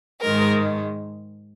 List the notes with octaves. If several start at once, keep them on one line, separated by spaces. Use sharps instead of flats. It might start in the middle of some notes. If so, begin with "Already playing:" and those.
G#2 D#3 G#3 A#4